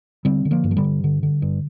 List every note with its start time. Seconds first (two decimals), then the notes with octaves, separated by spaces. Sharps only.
0.25 D3 G3 C4
0.45 D3
0.51 F3 A#3
0.64 G2
0.71 F3
0.77 D3 G3
0.84 G2
1.04 D3
1.23 D3
1.42 G2